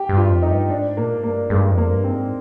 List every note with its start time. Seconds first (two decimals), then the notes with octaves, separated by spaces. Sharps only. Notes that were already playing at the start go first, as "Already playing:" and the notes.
Already playing: G4
0.09 G2
0.17 F4
0.30 F2
0.42 D#4
0.49 G2
0.70 G#2 D4
0.96 A#2 A#3
1.13 G#2
1.23 G2 A#3
1.50 G2 G#3
1.71 F2
1.78 A#3
1.91 G2
2.04 C4
2.11 G#2